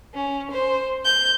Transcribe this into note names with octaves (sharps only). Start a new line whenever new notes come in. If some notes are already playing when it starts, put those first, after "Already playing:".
C#4
C5
G6